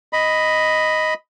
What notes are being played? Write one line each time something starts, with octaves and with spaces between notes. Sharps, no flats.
D#5 B5